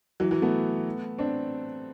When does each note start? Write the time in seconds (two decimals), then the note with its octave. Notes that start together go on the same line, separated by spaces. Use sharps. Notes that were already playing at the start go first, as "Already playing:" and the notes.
0.20 E3 F#3
0.31 E3 F#3
0.42 A3 B3
1.18 C4 D4